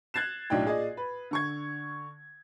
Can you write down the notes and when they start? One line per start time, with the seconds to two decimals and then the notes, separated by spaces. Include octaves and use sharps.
0.14 F#6 G#6 A6 C7 E7
0.50 B1 A2 D4 D#4 G5
0.65 A#2 G#4 D5 D#5
0.97 B4
1.31 D3 C#6 G#6